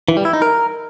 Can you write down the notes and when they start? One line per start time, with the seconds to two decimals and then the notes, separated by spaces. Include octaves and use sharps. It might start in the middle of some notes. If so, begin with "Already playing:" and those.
0.09 E3
0.17 G3
0.25 E4
0.33 D#4
0.42 A#4